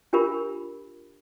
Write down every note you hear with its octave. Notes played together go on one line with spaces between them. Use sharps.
D4 F4 G4 A#4 B5